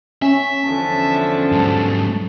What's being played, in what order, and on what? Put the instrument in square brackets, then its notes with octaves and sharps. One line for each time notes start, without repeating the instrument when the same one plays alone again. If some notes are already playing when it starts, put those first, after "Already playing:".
[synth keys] C#4 [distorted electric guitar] E5
[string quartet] E2 D3 F3 [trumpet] A5
[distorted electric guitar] G#2 F#3